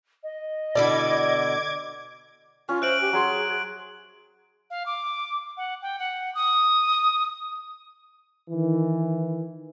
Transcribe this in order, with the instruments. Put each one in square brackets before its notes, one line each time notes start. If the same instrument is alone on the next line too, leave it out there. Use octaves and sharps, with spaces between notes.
[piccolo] D#5
[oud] B2 D3 E4 [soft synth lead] D5 [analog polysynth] D6 G#6
[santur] C#4 [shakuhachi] F4
[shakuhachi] C5 [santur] E5 [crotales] F#6 D7 F#7
[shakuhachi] G4
[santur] F#3 C6 [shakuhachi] G#4
[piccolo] F5
D6
F#5
G5
F#5
D#6
[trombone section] D#3 E3